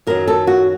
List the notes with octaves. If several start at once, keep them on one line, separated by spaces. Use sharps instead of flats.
F#2 D#3 F#3 A#4
A4
F#4